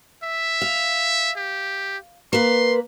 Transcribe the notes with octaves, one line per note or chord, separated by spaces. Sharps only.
E5
F5
G4
A#3 B4 C6